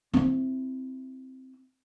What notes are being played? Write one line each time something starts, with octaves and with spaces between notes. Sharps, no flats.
C4 E4